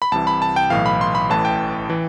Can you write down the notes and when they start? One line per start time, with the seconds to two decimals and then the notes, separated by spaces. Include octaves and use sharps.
0.02 B5
0.12 C2 C3 E3 A5
0.27 B5
0.42 A5
0.56 G5
0.70 B1 A2 E3 F5
0.86 B5
1.01 C6
1.15 B5
1.29 A1 A2 E3 A5
1.45 G5
1.90 E3